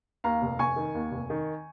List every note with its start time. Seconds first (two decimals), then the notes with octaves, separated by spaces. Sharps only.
0.24 D#2 F5 A#5
0.42 F1
0.59 F1 G#5 C#6
0.76 D#3
0.95 D#2
1.12 F1
1.30 D#3